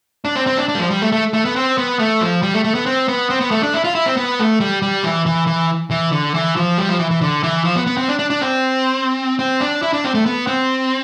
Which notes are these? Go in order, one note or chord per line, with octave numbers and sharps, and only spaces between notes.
D4
C4
C4
D4
D4
G3
F3
G3
A3
A3
A3
B3
C4
B3
A3
F3
G3
A3
A3
B3
C4
B3
C4
B3
A3
D4
E4
F4
E4
C4
B3
A3
G3
G3
E3
E3
E3
E3
D3
E3
F3
G3
F3
E3
E3
D3
E3
F3
B3
B3
C4
D4
D4
D4
C4
C4
D4
E4
D4
C4
A3
B3
C4